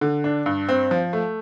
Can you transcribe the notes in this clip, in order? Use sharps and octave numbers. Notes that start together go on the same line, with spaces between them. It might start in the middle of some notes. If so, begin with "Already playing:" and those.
D3
D4
G2
C4
F3
A3